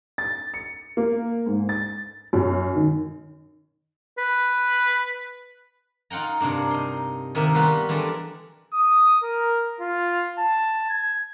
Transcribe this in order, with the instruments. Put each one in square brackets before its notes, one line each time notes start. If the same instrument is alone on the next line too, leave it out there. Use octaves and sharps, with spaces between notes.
[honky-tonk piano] A6
C#7
A#3
G#2
A6
F#2
D#3
[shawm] B4
[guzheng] D#4 F4 F#5 G5 A#5
G2 C3 A#3 D4 A#4
D#4 C6
C3 D#3 A#3 A#4 E5
G3 B3 F4 F#4 B4
E3 G3 G#3 D4 A4 A#4
[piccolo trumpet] D#6
A#4
F4
A5
G#6